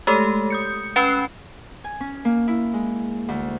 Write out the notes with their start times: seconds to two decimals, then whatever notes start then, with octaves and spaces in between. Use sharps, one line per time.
0.07 G#3 A3 G4 A4
0.50 D#6 G6 C#7
0.96 C#4 B4 G5 B5 F#6 C7
1.84 G#5
2.01 C#4
2.25 A#3
2.48 E4
2.74 G#3
3.28 D2